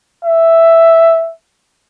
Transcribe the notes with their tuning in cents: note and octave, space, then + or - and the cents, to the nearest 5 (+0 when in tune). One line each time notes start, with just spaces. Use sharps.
E5 +0